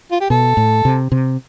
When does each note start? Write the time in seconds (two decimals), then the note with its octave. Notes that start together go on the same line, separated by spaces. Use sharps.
0.11 F4
0.20 G4
0.30 B2 A4
0.57 A2
0.85 C3
1.12 C3